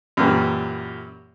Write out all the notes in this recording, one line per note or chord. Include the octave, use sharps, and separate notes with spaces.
F#2 A#2 E3 G3